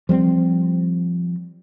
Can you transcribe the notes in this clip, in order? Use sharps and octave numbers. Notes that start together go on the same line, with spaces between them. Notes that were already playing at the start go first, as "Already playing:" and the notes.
F3 G3 B3 C4